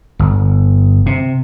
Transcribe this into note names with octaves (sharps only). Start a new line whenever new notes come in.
G1
C3